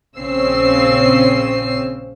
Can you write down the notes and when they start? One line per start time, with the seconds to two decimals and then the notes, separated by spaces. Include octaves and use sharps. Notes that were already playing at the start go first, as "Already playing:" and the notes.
0.17 A#1 C#3 C4 C#4 E6 C7